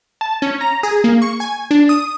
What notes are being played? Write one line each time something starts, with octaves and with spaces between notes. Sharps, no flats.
A5
C#4
A#5
G#4
A#3
C#6
G#5
D4
D#6